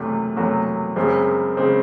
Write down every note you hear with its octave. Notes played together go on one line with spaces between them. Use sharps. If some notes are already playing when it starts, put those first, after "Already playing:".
Already playing: F#1 E2 C3 F#3 A3
F#1 E2 C3 F#3 A3
F#1 F#2 C#3 G#3 C4
C#3 G#3 C4